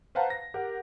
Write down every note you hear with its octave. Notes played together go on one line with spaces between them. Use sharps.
B4 C5 F5 F#5 A5 A#5
A#6
G4 A#4 F#5